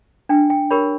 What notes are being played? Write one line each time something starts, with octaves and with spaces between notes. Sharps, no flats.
D4 G5
G5
G4 A#4 C#5 B5